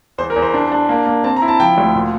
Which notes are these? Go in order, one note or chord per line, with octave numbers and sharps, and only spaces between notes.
E2 C5
A#4
E2
C5
D4
D4
A#3
A#3
C4 A5
A#5
E4
A5
F3 G5
D2
A#2